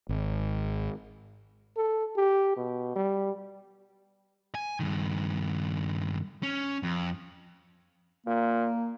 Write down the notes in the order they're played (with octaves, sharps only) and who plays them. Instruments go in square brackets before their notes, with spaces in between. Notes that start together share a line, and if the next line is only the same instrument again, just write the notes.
[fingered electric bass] G#1
[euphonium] A4
G4
B2
G3
[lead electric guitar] G#5
G2 D#3
C#4
F2
[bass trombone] A#2 [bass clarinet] A#3